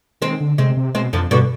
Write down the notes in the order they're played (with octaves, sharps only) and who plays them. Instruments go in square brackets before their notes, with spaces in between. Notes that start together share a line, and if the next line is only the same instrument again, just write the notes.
[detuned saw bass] D#3 [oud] G#3 C4
[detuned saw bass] D3
[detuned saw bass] C3 [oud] G#3 C4
[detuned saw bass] C3
[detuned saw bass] B2 [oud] G#3 C4
[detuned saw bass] F2 [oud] D3 F3
[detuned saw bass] G2 [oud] B2 D3